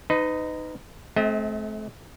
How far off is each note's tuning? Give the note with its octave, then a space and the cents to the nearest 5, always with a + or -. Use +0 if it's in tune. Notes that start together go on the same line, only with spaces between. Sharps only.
D#4 -5 B4 +35 D#5 +0
A3 -35 C4 +10 D#5 +40